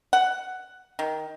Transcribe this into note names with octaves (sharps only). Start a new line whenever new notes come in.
F#5
D#3